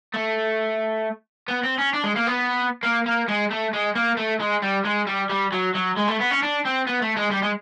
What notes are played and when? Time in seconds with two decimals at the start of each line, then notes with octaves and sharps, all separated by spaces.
0.14 A3
1.48 B3
1.63 C4
1.78 C#4
1.93 D4
2.04 G#3
2.16 A#3
2.27 B3
2.83 A#3
3.06 A#3
3.28 G#3
3.50 A3
3.73 G#3
3.95 A#3
4.17 A3
4.40 G#3
4.62 G3
4.85 G#3
5.07 G3
5.30 G3
5.52 F#3
5.74 F#3
5.97 G#3
6.08 A3
6.19 B3
6.30 C#4
6.42 D4
6.65 C4
6.87 B3
7.02 A3
7.17 G#3
7.31 G3
7.43 G#3